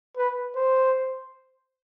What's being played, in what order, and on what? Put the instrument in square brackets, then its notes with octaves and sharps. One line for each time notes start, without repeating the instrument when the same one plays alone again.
[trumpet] B4
C5